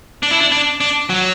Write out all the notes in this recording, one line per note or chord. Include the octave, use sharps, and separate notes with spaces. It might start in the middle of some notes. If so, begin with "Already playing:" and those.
D4
E4
D4
D4
D4
F#3